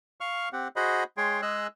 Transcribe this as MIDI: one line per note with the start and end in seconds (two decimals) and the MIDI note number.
0.21 0.49 77
0.21 0.49 85
0.21 0.49 89
0.53 0.68 60
0.53 0.68 67
0.53 0.68 78
0.76 1.04 66
0.76 1.04 68
0.76 1.04 72
0.76 1.04 75
0.76 1.04 78
0.76 1.04 83
1.17 1.41 56
1.17 1.41 68
1.17 1.41 73
1.17 1.41 79
1.17 1.41 84
1.42 1.67 56
1.42 1.67 68
1.42 1.67 75
1.42 1.67 88
1.42 1.67 90